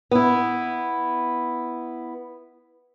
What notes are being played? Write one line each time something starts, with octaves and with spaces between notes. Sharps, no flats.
B3 E4